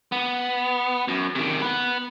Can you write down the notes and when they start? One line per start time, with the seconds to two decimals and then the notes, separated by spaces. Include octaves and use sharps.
0.12 B3
1.08 F#2
1.35 C3 D#3
1.62 B3 B4